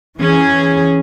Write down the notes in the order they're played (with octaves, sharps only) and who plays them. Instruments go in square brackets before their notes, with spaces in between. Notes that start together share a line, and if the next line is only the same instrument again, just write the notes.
[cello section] E3 C#4 G#4